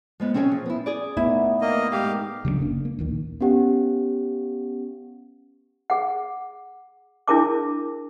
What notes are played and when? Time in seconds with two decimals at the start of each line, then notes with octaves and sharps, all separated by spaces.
0.20 F3 G#3 B3
0.34 C4 C#4 E4 G#4 C#5 G5
0.52 F3
0.66 B3 E4
0.86 G#4 D5
1.17 A3 B3 D#4 E4
1.61 A#3 D#5
1.92 G#2 G4 F5 D#6
2.45 C#3 F#3 A3 D4
2.58 F#1 C#3 A#3 D4
2.85 A#3
2.99 A#1 D#2 D#3
3.41 B3 C#4 G4 F#5
5.90 G#4 F#5
7.28 D4 E4 G#4 A#4 A5 D6